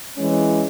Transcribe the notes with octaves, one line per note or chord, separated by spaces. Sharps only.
E3 G#3 C#4